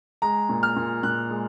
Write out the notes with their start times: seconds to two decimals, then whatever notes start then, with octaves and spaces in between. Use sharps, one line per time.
0.22 G#3 A#5
0.49 A#2
0.63 F6
0.77 A#2
1.03 A#2 F#6
1.30 G#3